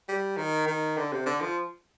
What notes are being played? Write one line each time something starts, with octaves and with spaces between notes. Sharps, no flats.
G3
D#3
D#3
D3
C3
D3
F3